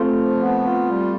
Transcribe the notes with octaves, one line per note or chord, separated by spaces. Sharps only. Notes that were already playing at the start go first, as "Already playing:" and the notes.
Already playing: A3 C4 F4
F3
B3
F4
G3